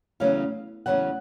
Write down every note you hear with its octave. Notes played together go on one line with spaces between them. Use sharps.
E2 C#3 F#3 A3 C#4 F5
E2 C#3 F#3 A3 C#4 F#5